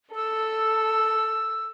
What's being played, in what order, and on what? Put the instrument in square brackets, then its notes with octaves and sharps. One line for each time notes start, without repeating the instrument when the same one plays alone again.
[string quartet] A4 [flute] E6